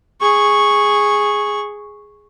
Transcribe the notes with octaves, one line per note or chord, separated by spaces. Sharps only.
G#4 C#6